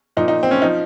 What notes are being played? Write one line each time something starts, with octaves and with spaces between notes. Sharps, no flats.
A#2 F3 D#4
D#4
C4
C#4
F3 D#4